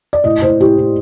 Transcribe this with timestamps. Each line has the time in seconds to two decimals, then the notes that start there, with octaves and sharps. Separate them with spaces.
0.13 D5
0.24 A2 D#5
0.42 A2 C5
0.60 A2 G4
0.78 A2